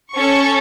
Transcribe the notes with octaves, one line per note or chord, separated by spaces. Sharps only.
C#4 A4 C#6